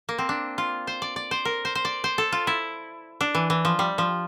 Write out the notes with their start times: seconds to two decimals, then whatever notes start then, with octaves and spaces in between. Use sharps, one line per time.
0.09 A#3
0.18 C4
0.29 D4
0.58 F4
0.87 C5
1.02 D5
1.16 D5
1.31 C5
1.45 A#4
1.65 C5
1.75 C5
1.85 D5
2.04 C5
2.18 A4
2.32 F4
2.47 E4
3.21 D4
3.35 E3
3.50 E3
3.65 F3
3.79 G3
3.98 F3